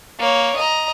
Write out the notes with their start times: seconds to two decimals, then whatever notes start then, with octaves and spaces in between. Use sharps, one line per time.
0.19 A#3 C#5
0.57 D#5 A#5